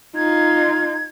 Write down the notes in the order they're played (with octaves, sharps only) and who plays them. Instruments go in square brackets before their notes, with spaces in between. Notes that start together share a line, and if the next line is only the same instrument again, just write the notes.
[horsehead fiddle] D#4 F4 [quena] G#6